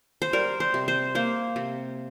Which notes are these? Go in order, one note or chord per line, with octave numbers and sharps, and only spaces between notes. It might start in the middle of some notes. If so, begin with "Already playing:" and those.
C5
G3 A#4
C5
C3
C5
A#3 C5
C3